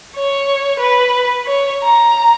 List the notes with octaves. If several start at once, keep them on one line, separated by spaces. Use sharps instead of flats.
C#5
B4
C#5
A#5